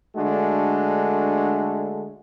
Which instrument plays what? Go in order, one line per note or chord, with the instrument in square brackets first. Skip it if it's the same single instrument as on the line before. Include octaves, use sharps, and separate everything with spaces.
[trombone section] D3 G#3 A3 D4 F#4